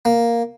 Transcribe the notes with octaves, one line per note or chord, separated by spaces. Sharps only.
A#3